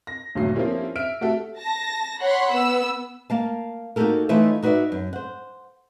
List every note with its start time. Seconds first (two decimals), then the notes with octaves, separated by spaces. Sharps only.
0.07 A#6
0.35 G1 D#2 A#2 F#3 A3 C7
0.55 F3 A#3 C4 C#4 E4 G4
0.96 E5 F6 D7
1.21 A3 F#4 G4 A4 E5
1.58 A5 A#6
2.22 C#5 F#5 B5 C6
2.53 B3 E6
3.30 A#3 F5 A5
3.96 A#3 D#4 F#4 G4 A4 A#4
4.29 E3 A3 D#4 F4 C#5 E5
4.62 D#4 F#4 B4 C5 D5 E5
4.92 F#2
5.13 C5 F#5